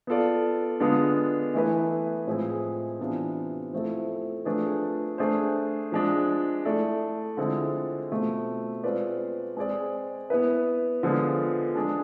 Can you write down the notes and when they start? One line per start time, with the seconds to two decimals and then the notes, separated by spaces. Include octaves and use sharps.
0.07 B3 F4 A4 D5
0.80 D3 G#3 B3 D4 F4
1.54 E3 A3 E4 B4
2.27 A2 F3 G#3 C4 G#4
3.00 C3 E3 B3 D4 F4
3.73 F3 A3 C4 E4 A4
4.45 F3 A3 D4 G#4 B4
5.18 A3 D4 G#4 C5
5.92 F3 G#3 D4
6.65 A3 E4 A4 D5
7.37 D3 F3 G#3 C4 E4
8.11 B2 A3 C4 F4
8.84 G#3 C4 F4 B4 D5
9.57 G#3 C4 G#4 D5
10.30 B3 E4 B4
11.03 D3 F3 G#3 B3 F4
11.75 G#3 D4 G#4